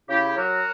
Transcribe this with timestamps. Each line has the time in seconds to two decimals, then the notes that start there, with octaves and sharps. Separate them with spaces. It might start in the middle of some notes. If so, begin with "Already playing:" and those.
0.09 C#3 E4 G4
0.37 F#3 F#4 A#4